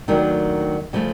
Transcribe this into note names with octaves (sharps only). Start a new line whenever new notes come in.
D#2 D#3 F#3 A3 D4
C#3 F3 A3